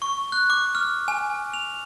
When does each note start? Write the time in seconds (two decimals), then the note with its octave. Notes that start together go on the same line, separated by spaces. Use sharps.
0.02 C#6
0.32 F#6
0.50 D6
0.75 F6
1.08 G#5
1.54 F7